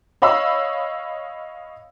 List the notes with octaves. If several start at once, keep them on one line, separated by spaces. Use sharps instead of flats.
C#5 D#5 F5 B5 E6